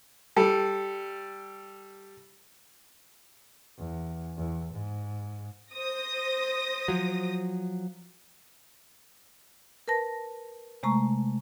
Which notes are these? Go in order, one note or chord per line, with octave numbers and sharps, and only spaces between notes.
G3 A4
E2
E2
G#2
C5 D#6 A#6
F3 F#3
A#4 B4 A5 A#6
C3 G#3 A3 A#5 C#6